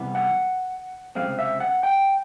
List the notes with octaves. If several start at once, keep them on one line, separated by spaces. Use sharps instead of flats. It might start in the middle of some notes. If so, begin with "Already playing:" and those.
Already playing: C3 E3 G3 B3
F#5
C#2 C3 F3 G#3 C4 F5
E5
F#5
G5